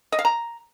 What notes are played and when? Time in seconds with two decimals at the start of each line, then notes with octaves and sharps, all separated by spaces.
0.12 D#5
0.19 F5
0.25 A#5